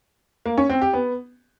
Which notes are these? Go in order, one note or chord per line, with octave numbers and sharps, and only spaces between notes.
A#3
C#4
C4
G4
B3